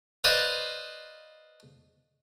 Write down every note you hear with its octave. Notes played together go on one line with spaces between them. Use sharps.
B4 C5 D5 D#5 F5